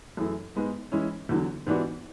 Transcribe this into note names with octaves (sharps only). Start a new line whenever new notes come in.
F#2 E3 A3 E4 G#4
G#2 G#3 B3
E3 G#3 C#4 E4
E2 D3 F#3
G#2 E3 B3 D4 F#4